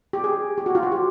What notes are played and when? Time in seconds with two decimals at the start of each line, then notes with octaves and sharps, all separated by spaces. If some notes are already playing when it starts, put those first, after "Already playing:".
0.13 G4
0.24 G#4
0.58 G4
0.66 F#4
0.75 F4
0.83 F#4
0.92 G4